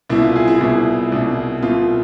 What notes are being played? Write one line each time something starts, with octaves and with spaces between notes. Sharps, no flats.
C2 B2 E4
F4
G#4
E4
C2 B2 E4
C2 B2
C2 B2 F4